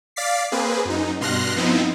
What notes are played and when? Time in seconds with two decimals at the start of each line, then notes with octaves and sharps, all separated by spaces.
0.16 D5 F5 D6 A6 B6 C7
0.52 A#3 C4 G#4 B4
0.85 F#2 D#4
1.20 G2 B2 C6 F6 F#6 A#6
1.56 F3 B3 C4 D#4 E4